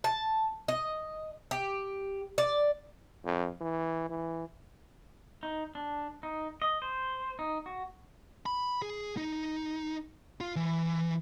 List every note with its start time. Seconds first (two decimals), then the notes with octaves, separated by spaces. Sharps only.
0.04 A5
0.68 D#5
1.51 G4
2.38 D5
3.25 F2
3.61 E3
4.10 E3
5.43 D#4
5.75 D4
6.23 D#4
6.62 D#5
6.82 C5
7.39 D#4
7.66 F#4
8.46 B5
8.82 G#4
9.17 D#4
10.41 F4
10.56 E3